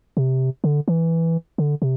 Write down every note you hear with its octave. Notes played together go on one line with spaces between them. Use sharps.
C3
D3
E3
D3
C3